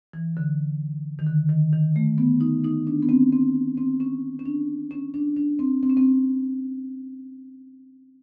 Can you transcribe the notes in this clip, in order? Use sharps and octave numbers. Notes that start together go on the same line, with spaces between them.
E3
D3
D#3
D3
D#3
D#3
A3
B3
D#4
D#4
D4
B3
C4
C4
C4
C#4
C#4
D4
C#4
D4
D4
C4
C4
C#4
C4